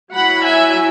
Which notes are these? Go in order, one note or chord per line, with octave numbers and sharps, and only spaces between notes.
F#3 E4 F#5 B5
E5 G#5